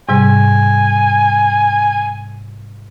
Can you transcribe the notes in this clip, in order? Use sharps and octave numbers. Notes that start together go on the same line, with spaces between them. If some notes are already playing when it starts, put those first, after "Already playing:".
G#2 C3 G3 G#5